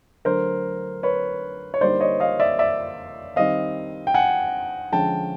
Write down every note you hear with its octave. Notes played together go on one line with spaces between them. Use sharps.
D3 F#3 A3 A#4 C5
B4 C#5
C#5
D3 G3 A#3 D#4 C5 D5
C#5 D#5
D#5 F5
D5 E5
D5 E5
D#3 G3 C4 D#5 F5
G5
F#5 G#5
D3 F3 G#3 C#4 G5 A5